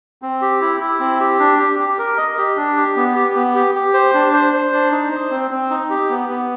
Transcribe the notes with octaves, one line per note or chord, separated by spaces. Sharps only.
C4
G4
E4
E4
C4
G4
D4
G4
G4
A#4
D#5
G4
D4
G4
B3
G4
B3
G4
G4
C5
D4
C5
C5
D4
D#4
C5
C4
C4
D#4
G4
B3
B3